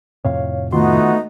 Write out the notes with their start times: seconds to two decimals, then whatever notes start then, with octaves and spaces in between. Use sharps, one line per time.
0.25 F2 A2 C3 C#5 F5
0.73 D#3 A3 B3 D#4 F4 F#4 C6